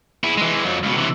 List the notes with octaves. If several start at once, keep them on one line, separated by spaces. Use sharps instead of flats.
E4 G#4
E3 G#3
F2 F#3
C#2 B2
C3 E3